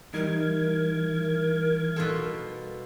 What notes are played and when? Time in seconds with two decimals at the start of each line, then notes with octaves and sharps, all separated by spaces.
0.14 E3 G3 D#4 A#4 G#6
1.96 B2 F4 A4